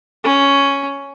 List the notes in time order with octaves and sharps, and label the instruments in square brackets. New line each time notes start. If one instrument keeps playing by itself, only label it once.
[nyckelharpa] C#4